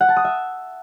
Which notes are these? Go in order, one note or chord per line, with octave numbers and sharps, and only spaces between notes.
F#5
A5
D#6
E5